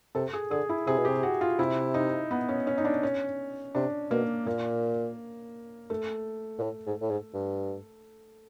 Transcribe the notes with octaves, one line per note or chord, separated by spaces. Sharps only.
C3 A4
G#4
D3 G#4
E4
C3 G#4
B2
G4
C3
F#4
F4
C3 E4
D#4
B3
C#4
C#4
D#4
D4
C#4
C3 D4
B2 A#3
A#2 A#3
A3
A#2
A2
G#2
A2
G#2
G2